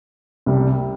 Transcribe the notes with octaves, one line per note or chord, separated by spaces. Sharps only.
C2 C3 G3